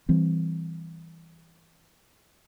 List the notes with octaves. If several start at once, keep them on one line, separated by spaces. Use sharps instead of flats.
E3 G3 C4